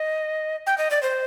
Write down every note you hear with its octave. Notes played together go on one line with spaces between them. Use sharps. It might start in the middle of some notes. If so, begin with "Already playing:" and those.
Already playing: D#5
G5
D#5
D5
C5